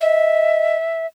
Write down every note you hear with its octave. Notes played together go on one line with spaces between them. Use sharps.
D#5 E5